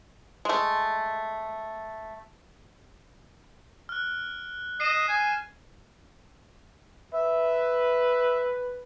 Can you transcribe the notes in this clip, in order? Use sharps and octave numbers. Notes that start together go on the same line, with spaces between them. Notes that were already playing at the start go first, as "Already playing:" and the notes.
G#3 A3
F6 F#6
D#5 C7 D#7 E7
G#5
B4 E5